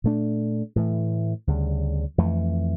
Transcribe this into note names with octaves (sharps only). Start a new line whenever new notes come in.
A#2 A3 D4
A2 E3 A3
D2 C#3 G3
F2 E3 A3